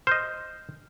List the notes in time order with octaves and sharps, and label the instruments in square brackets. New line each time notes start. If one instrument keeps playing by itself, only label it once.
[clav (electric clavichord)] C5 D#5 [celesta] F6 G6